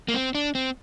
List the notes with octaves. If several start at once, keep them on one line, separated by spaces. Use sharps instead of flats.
A#3
C4
D4
C4